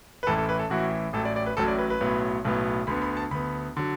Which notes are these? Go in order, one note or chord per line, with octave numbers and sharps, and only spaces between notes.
B4
A1 A2 E3 A4
A4
B4
A4
A1 A2 E3 F#4
A1 A2 F#3 A4
D5
D5
B4
A1 A2 F#3 A4
D5
B4
B4
B1 A2 F#3 B3
B1 A2 F#3 B3
D2 D3 B3 B5
B5
A5
D2 D3 B3 B5
D3 F#3